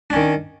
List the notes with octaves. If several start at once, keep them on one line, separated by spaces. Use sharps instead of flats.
D#3 C#4 D4